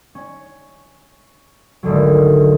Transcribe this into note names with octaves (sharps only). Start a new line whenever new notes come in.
C#4
G#1 D2 D3 F#3